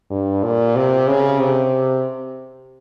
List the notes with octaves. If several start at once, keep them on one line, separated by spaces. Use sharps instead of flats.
G2
A#2
C3
C#3
C3